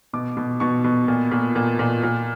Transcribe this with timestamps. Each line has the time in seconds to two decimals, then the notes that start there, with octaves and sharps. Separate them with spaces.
0.13 B2 D6
0.37 B2
0.60 B2 C#6
0.84 B2
1.08 A#2
1.31 A#2
1.55 A#2
1.79 A#2
2.03 A#2